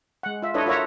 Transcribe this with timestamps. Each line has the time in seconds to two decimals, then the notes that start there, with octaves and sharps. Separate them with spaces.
0.23 G#3 F#5
0.42 F4 E5
0.54 D4 E4 A4 B4 C#5 D#5
0.66 F4 F#4 A#4 C#5 E5 A#5